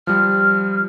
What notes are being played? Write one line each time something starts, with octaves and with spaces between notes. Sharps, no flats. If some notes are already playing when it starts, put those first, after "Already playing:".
F3 G3 F6